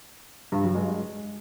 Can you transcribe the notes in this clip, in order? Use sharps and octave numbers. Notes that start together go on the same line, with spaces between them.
G2
F#3
G#3